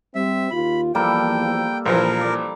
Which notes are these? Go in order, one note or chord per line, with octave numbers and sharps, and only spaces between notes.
G3 C4 E5
D#2 F4 B5
E2 F3 G3 A#3 A4 G5
A#1 A#2 E3 F3 A#4
D5